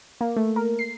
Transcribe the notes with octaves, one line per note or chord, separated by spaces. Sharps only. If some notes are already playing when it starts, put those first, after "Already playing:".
A#3
A3
A#4
C7